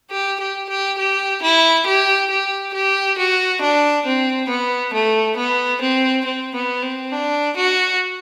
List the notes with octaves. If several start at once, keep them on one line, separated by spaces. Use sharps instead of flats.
G4
G4
G4
G4
E4
G4
G4
G4
F#4
D4
C4
B3
A3
B3
C4
C4
B3
C4
D4
F#4